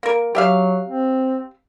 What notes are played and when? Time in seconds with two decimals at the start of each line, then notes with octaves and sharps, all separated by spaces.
0.03 A#3 A#4
0.35 F#3 G4 E5 F5
0.89 C4